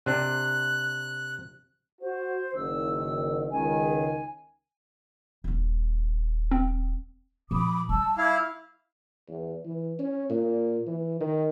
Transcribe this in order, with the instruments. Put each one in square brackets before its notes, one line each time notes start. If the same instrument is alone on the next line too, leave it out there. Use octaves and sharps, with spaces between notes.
[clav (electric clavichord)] C3 D4 [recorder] F#6
[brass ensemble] F#4 [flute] C5
[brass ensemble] F#1 D#3 [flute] E6
[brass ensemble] C#2 D#3 [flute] G#5
[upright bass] D#1 D4
[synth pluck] C4
[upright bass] A#2 F3 [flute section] B5 D6 D#6
[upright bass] G3 [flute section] A5 E6
[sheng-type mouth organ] E4 F5 [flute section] B5 D6 G#6
[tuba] E2
E3
C#4
A#2
E3
D#3